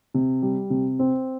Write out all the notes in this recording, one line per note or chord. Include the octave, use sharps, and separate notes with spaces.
C3
G3
C3
C4